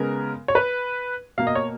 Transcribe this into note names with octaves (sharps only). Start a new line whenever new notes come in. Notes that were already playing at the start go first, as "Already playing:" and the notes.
Already playing: C#3 G#3 B3 A#4
C#5
B4
B2 A#3 F5
D#5
C#5